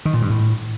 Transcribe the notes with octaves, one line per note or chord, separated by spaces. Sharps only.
D#3
A#2
G2
A2